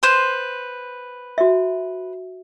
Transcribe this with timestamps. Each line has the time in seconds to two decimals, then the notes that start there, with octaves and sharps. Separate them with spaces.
0.03 B4 C5 C6
1.38 F#4 E5